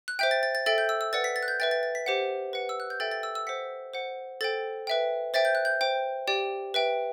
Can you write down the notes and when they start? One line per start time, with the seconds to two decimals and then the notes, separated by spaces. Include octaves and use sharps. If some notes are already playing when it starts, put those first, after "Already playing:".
0.08 F#6
0.19 C5 E5 G5 G6
0.31 A6
0.43 A6
0.55 A6
0.66 A4 E5 G5 A6
0.78 G6
0.89 E6
1.01 E6
1.13 B4 D5 F#5 A6
1.24 B6
1.36 A6
1.43 F#6
1.48 G6
1.60 B4 E5 G5 A6
1.71 A6
1.83 A6
1.95 B6
2.06 G4 C5 F#5
2.53 B4 F#5
2.69 E6
2.80 F#6
2.90 G6
3.00 A4 E5 G5 A6
3.11 A6
3.23 E6
3.35 E6
3.47 C5 F#5 B6
3.93 C5 F#5
4.41 A4 C5 G5 A6
4.87 B4 E5 G5
5.34 C5 E5 G5 A6
5.45 G6
5.55 F#6
5.65 G6
5.81 C5 G5
6.27 G4 D5 G5
6.74 B4 E5 G5